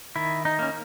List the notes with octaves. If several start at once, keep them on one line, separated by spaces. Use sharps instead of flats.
D#3 E4
D#4
A#3 C#4